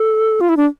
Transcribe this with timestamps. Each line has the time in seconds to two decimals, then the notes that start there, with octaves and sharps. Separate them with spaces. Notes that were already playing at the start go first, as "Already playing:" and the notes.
Already playing: A4
0.41 F4
0.49 E4
0.57 D4